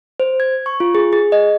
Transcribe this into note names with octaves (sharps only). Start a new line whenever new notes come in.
C5
G#6
C#6
F4
G#4
G#4
D#5